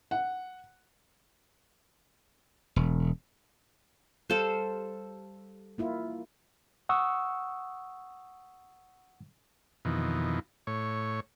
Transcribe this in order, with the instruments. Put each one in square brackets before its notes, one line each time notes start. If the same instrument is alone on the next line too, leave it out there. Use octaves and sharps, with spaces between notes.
[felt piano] F#5
[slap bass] E1
[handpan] G3 F5 [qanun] A4 C5
[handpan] A#3 E4 F4
[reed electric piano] F#5 C#6 D#6 E6
[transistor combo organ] F2 B2 D#3 E3
A2 C#5